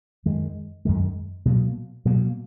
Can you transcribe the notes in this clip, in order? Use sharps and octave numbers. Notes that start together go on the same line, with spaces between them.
F#2 D#3 G#3
F#2 D#3 G#3
B2 F#3 A#3
B2 F#3 A#3